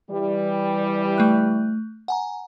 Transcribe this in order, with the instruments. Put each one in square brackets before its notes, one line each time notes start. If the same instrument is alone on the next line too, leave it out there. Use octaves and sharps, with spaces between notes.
[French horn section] E3 G3
[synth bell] A3 F#6
F#5 G#5 A#5